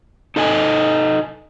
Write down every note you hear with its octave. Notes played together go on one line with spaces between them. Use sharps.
D#4 A4 D#5 G#5